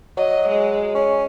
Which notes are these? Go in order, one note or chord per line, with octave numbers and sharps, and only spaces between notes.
F#3 D#5
G#3
C#4